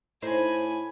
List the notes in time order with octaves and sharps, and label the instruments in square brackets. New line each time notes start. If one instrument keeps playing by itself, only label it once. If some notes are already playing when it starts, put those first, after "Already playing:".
[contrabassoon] A2 [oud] D#4 C5 [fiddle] G#5 B5